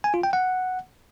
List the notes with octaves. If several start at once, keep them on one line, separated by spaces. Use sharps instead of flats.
G#5
F4
G5
F#5